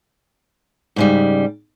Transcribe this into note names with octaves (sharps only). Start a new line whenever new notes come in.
G#2 C#3 G3